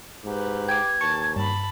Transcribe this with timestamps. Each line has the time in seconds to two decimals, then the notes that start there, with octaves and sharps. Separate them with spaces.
0.25 G#2 G4 B4
0.68 G5 D6 G#6
1.01 D#2 A5 C#6
1.36 G2 A5 B5